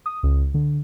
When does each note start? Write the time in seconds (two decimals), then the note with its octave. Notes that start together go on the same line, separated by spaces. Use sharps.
0.06 D#6
0.23 C#2
0.54 D3